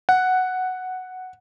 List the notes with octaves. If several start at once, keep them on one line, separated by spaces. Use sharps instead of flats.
F#5